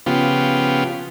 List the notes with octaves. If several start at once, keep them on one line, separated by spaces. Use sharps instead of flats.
C#3 F3 B3 F4 G4